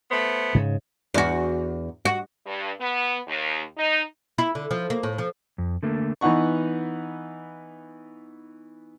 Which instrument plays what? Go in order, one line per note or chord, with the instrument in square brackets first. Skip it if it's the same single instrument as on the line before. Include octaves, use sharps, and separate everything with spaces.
[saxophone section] A3 B3 C5
[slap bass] G#2 C#3
[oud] E2 F#4
F#4
[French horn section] G2
B3
D#2
D#4
[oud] E4
D3
F3
A#3
A2
F3
[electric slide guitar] F2
D3 A3 A#3
[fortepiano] E3 B3 D#4 F#5 C#6